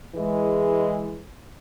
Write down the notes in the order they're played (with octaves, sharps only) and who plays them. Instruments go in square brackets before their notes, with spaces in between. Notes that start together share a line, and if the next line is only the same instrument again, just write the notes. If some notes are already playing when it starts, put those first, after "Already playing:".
[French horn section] E3 G#3